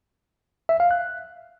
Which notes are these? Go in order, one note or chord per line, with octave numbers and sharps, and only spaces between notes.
E5
F5
F#6